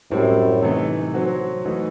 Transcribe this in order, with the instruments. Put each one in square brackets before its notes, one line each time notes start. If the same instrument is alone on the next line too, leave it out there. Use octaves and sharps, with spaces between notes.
[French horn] F#2 [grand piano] A2 G3 C4 E4
[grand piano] C3 E3 A3 D#4
F#3 C4 F#4
E3 A3 D#4 F#4